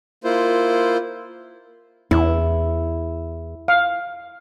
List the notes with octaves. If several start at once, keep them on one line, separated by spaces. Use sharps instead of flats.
A#3 E4 F4 C5
E2 E4
F5